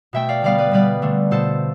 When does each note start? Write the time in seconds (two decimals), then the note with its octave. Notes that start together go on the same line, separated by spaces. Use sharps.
0.13 B2 A3 E5 G5
0.29 D5 F5
0.42 D3 G3 B3 D5 F5
0.58 B4 D5
0.71 B2 G3 B3 B4 D5
1.02 D3 A3
1.31 B2 A3 A4 C5